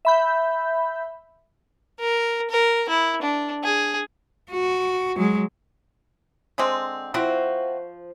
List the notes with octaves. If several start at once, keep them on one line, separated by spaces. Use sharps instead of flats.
E5 B5 G6
A#4
A#4
E4
D4
G#4
F#4
F#3 G#3
D3 G#3 C4
F3 C4 E4 F#4